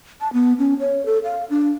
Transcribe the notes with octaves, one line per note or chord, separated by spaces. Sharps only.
A5
B3
C#4
C#5
A4
F5
D4